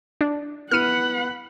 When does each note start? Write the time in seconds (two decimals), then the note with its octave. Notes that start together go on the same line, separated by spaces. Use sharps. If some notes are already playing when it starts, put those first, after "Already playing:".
0.21 D4
0.71 B3 E4 F#5 B5 F6 C#7 D#7